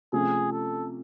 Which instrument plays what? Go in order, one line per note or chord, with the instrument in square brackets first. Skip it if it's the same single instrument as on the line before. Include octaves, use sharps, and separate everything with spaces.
[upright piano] C3 F3 A3 C#4 [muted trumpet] G#4
[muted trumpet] A4